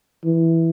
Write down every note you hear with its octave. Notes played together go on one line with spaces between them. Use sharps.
E3